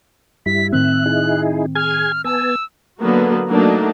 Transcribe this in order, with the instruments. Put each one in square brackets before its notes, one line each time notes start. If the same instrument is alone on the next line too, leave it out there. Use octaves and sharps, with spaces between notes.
[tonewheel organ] G2 G3 E4 [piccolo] B6
[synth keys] A2 D#3 C4 [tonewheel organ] E5 [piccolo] F#6
[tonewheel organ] D#4 E4 G#4
[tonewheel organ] G#4 G#5 G#6 [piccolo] F6
[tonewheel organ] B3 G#5 A5 [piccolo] E6
[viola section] D3 F#3 A#3 B3 F#4
F#3 A3 A#3 D4 D#4